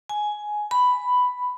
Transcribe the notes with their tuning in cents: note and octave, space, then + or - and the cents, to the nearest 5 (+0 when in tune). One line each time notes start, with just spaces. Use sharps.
G#5 +10
B5 +5